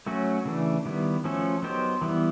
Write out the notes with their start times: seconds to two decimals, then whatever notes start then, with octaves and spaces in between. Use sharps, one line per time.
0.07 F#3 A3 C#4 F#4
0.45 C#3 E3 A3 D4
0.85 D#3 G3 B3 E4
1.24 F3 A3 C#4 F#4 A4
1.62 F#3 B3 D#4 G4 C5
2.01 E3 G3 B3 E4